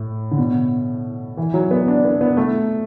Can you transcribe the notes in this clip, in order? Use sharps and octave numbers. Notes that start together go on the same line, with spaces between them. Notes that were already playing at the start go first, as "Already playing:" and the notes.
Already playing: A2
D3
B2
E3
F#3
B3
D4
B3
B3
A3